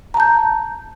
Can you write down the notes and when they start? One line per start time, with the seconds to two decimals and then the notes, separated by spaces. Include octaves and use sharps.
0.14 A#5
0.17 A5
0.20 G6